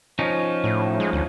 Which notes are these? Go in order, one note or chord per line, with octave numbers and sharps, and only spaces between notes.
F3 C#4 D#4
A2
G#3
D2